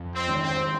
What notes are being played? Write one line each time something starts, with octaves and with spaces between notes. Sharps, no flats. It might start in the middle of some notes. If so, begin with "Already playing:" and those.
Already playing: F2
C4
D#3 G#3 C#4
C4